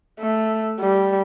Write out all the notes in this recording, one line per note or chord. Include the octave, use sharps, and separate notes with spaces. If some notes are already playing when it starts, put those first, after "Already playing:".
A3
G3